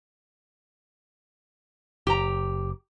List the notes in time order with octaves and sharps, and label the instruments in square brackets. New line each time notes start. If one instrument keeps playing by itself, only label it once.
[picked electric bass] F#1 [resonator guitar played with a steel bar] G4 A#5